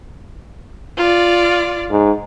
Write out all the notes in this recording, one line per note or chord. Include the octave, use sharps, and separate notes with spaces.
F4 D5
G#2